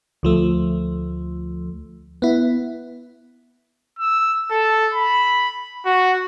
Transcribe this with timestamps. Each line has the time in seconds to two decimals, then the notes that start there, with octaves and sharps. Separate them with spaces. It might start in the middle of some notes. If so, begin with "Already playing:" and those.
0.23 D2 F3 A3
2.22 B3 E4
3.99 E6
4.51 A4
4.94 B5
5.86 F#4